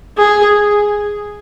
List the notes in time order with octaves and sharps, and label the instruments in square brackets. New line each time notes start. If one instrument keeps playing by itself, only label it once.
[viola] G#4